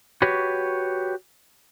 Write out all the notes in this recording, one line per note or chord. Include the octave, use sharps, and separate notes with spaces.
F#4 G4 B4 C#5